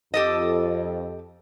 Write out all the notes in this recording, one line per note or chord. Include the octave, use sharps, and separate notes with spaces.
F2 G4 A4 D#5